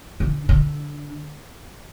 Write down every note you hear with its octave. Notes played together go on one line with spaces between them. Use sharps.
D3
D3